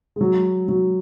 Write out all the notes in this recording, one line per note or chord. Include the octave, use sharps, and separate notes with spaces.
G#3
F#3
F#3